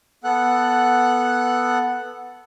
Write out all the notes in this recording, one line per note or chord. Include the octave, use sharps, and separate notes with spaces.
B3 A4 F#5 F#6